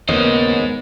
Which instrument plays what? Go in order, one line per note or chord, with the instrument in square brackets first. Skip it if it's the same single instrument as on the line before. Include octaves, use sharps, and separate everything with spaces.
[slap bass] D#2 C#3 [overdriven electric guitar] G#2 C5 [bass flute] B3 [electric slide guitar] A#4 C#5 D#5